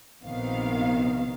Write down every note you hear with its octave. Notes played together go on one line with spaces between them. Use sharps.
A#1 C3 D#3 B3 F5